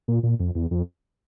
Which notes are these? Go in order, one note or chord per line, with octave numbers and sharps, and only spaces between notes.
A#2
A#2
F2
E2
F2